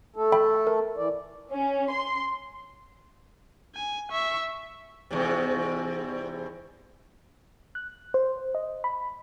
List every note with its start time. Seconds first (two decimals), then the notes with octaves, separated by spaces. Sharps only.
0.16 A3 A4
0.32 E5 G5 B5
0.67 A#4
0.97 E3 D5
1.52 C#4
1.92 C6
3.75 G#5
4.11 E5 C#6
5.11 E2 G#2 C3
7.75 F#6
8.14 C5
8.55 D#5
8.84 B5